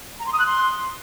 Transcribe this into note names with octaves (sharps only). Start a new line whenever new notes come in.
A#5
C6
D#6
F#6
C6